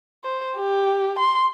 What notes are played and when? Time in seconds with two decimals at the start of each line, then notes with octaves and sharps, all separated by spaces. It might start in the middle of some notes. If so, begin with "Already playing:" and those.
0.24 C5
0.57 G4
1.19 C6